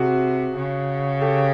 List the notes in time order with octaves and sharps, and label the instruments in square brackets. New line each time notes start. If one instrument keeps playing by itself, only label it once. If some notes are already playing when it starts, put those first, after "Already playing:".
Already playing: [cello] C3 [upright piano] F#4 G#4
[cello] C#3
[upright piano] G4 A4